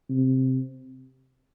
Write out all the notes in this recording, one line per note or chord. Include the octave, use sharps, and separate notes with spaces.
C3